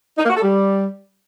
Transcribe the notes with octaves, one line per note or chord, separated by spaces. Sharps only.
D#4
A#3
F#4
A4
G3